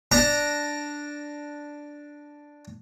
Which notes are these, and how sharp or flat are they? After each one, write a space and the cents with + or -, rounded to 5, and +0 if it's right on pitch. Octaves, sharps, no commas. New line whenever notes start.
D4 +0 A#5 -5